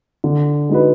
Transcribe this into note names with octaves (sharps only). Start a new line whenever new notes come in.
D3
G#3 D#4 F#4 B4